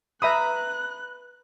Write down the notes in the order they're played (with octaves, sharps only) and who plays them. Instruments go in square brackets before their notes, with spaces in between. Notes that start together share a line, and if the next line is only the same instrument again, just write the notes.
[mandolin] B4 A#5 [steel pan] E5 B5 D#6 [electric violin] F#6